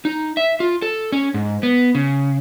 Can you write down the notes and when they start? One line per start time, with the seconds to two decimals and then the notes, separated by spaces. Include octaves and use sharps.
0.05 D#4
0.37 E5
0.60 F4
0.82 A4
1.12 C#4
1.34 G#2
1.63 B3
1.95 C#3